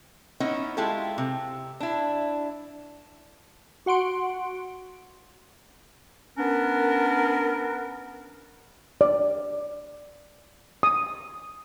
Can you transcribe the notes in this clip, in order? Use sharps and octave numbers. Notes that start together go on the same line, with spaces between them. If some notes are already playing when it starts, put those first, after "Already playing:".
B3 C#4 D#4 E4
G#3 E4 F4 G4 A4
C3
D4 E4
F#4 F#5 C6 D7
B3 C#4 D4 A#4
D5
D#6